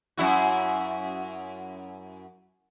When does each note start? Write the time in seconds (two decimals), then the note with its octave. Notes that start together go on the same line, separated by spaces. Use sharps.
0.17 F#2 E4 F#4